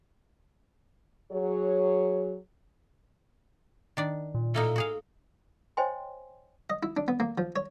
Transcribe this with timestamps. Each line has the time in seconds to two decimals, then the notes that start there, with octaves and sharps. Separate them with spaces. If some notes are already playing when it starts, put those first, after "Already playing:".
1.32 F#3 G#4 C#5
3.97 D#3 D4 D5
4.35 A#2
4.55 A2 A#3 D#4 A4
4.76 F#4 G#4 F5
5.77 C5 C#5 D#5 G5 G#5 C6
6.70 D#5
6.83 E4
6.97 D4
7.08 B3
7.20 A#3
7.38 F3
7.56 C#5